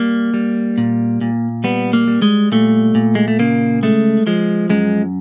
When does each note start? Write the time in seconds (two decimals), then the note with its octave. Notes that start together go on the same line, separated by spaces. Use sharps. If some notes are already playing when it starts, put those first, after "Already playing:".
Already playing: G3 A#3
0.34 G3
0.78 A#2
1.21 A#2
1.64 G3 B3
1.93 A#3
2.08 G3
2.22 G#3
2.52 A#2 A3
2.95 A#2
3.15 G#3
3.28 A3
3.39 C#3 A#3
3.83 G#3 A3
4.27 F3 G#3
4.70 F#2 G#3